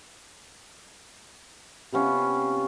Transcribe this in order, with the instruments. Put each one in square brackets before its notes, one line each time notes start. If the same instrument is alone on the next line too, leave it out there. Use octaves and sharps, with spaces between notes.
[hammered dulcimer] C3 B3 C#4 F4